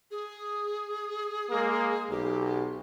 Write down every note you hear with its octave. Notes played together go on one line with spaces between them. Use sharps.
G#4
G#3 A#3
B1 G4